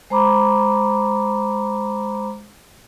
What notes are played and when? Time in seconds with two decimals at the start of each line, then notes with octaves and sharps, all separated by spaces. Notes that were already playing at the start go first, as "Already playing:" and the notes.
0.10 G#3 C5 A#5 B5 D6